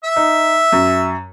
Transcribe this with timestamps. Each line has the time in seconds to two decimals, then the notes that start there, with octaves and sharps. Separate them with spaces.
0.04 E5
0.16 D#4
0.73 F#2